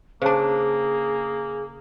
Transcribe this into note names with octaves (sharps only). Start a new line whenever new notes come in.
C#3 A#3 D4 G#4 C5 C#5 A5